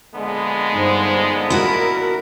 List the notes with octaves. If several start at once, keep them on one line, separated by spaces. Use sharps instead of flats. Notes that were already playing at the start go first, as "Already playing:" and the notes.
A#1 D3 G#3 B3
G2 D#4 C5
E4 F#4 A#4